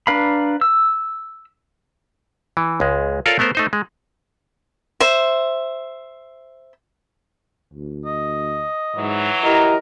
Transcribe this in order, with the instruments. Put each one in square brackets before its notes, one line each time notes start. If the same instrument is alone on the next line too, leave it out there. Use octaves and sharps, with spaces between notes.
[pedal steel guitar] D4 B4 F5 A#5 B5
E6
[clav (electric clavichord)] E3
C#2 G#3
F4 A4 A#4 C#5 D5 F5
A3 B3 A#4 C5
A3 D#4 C5
G#3
[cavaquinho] C5 E5
[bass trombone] D2
[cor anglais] D#5
[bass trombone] G#2 [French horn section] E3 F#3
[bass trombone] E4 [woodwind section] G4 D#5 A#5 [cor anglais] A#4